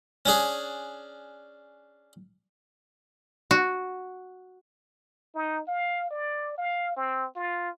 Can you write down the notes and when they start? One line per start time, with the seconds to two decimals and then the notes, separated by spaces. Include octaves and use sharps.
0.26 C#4 D4 G#4
3.51 F#4
5.35 D#4
5.68 F5
6.11 D5
6.58 F5
6.96 C4
7.36 F4